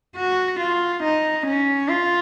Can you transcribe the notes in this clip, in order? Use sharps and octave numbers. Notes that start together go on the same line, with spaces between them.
F#4
F4
D#4
C#4
F4